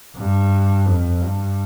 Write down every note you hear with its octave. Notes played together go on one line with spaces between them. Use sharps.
G2
F2
G2